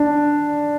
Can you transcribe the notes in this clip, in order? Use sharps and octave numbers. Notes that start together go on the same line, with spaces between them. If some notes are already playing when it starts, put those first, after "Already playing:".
Already playing: D4